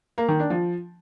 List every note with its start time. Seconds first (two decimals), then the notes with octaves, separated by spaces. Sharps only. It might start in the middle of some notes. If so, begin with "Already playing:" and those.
0.18 A#3
0.29 D#3
0.39 D4
0.50 F3